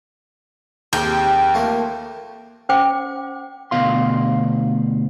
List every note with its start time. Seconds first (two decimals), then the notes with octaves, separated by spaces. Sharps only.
0.93 D#2 C4 G4 G#4 G5 G6
1.54 F3 A3 A#3
2.69 C#4 C5 F#5 G5 D6
3.71 D2 B2 F5 C6